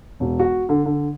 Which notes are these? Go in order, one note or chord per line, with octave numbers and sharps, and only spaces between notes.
E1
F#4
D3
D3